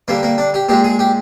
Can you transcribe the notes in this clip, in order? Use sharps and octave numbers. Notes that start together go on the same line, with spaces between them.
D3 G3 A#3
A#3
D4
G4
A#2 G#3 G4
G#4
G4